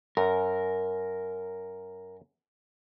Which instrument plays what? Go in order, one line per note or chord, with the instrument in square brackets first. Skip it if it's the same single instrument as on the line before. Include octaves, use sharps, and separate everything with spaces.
[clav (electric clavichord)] F#2 [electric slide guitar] A#4